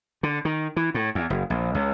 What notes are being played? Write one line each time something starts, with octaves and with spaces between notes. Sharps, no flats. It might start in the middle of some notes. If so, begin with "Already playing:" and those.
D3
D#3
E3
A2
E2
F#1
A#1
C#2